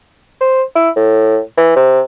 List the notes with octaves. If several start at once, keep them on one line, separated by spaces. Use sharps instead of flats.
C5
E4
A2
E3
C3